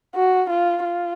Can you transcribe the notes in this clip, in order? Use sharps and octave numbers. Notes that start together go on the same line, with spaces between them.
F#4
F4
F4